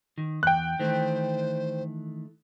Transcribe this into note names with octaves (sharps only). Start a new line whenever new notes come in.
D#3
E2 G5 F#6
D#3 E3 A3 C5